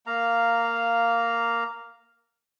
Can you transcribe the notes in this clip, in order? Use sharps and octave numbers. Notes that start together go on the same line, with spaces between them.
A#3 F5 A#5